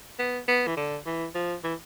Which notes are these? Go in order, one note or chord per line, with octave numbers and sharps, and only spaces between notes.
B3
B3
E3
D3
E3
F3
E3